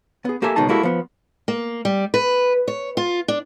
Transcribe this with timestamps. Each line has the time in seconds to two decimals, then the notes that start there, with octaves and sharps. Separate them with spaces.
0.25 B3 G#4
0.42 A#3 G4 A4 E5 G#5
0.56 C#2 B2 D#3 G#3 D#4 A5
0.69 G#3 A#3 E4 F#4 G4 A4
0.83 F3 B3
1.48 A#3
1.85 G3
2.14 B4
2.68 C#5
2.97 F4
3.28 D4